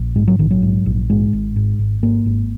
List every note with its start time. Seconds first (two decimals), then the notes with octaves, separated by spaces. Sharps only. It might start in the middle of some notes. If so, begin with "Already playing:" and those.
Already playing: A#1
0.16 G#2 G#3
0.27 F#3
0.39 A#1 D#3
0.51 F#3
0.62 G#2
0.86 A#1
1.09 G#2 G#3
1.33 G#1
1.56 G#2
1.79 G#1
2.02 G#2 A#3
2.26 G#1